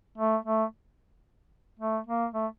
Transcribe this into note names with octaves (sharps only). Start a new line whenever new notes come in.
A3
A3
A3
A#3
A3